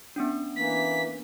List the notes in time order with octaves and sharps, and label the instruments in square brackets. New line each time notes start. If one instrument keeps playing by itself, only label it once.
[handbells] B3 C#4 D4
[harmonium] E3 A#3 [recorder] B6